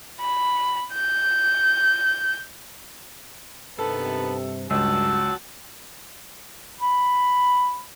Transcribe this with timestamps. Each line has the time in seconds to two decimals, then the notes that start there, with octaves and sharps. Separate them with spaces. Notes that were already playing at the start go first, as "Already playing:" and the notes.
0.21 B5
0.94 G6
3.79 G2 C3 D#3 B3 A4 B4 A5
4.70 C#2 G2 F#3 F#5 A5 E6
6.81 B5